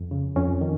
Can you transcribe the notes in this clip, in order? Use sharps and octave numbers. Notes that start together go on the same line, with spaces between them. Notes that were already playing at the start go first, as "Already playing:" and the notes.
Already playing: F2
C#3
F2 C#4
D#3